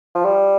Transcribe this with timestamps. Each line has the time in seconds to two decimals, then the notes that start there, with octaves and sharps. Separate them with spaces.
0.15 F3
0.25 G3